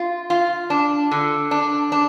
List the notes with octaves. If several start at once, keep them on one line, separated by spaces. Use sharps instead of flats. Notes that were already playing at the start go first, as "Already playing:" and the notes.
Already playing: F4
F4
D4
D3
D4
D4